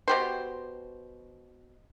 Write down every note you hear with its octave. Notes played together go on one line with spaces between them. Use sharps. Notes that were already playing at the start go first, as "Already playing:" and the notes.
B2 G4 C5